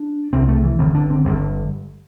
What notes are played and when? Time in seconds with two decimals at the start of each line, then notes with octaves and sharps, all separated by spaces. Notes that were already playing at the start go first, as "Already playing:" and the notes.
Already playing: D4
0.33 C2 C3 C4
0.48 A3
0.64 E3
0.79 G1 G2 D3 C4
0.95 D4
1.10 C4
1.25 G1 G2 D3 G3